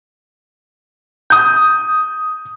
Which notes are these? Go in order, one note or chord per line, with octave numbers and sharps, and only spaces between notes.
D#6 G6